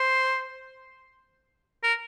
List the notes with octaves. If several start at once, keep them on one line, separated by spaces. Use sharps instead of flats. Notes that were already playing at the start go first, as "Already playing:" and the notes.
Already playing: C5
A#4